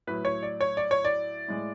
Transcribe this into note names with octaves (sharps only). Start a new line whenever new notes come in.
A2 F#3 B4
C#5
D5
C#5
D5
C#5
D5
A2 G#3